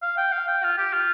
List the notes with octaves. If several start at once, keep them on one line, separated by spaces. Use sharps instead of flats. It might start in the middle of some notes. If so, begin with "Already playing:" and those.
F5
G5
F5
G5
F4
G4
F4